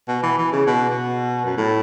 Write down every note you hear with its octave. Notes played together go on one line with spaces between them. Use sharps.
B2
E3
E3
C#3
B2
B2
F#2
A2